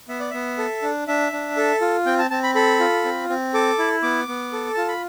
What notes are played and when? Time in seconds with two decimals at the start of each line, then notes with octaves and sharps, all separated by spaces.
0.08 B3 E5
0.20 D5
0.31 B3 E5
0.58 A4
0.82 D4
1.07 D4 E5
1.32 D4
1.57 A4
1.81 F4
2.06 C4 G5
2.19 A5
2.30 C4 A5
2.43 B5
2.55 A4 B5
2.79 F4
3.05 C4
3.29 C4
3.54 A4 D6
3.79 E4
4.03 B3 D6
4.28 B3
4.53 A4
4.74 F4 A5
4.88 B5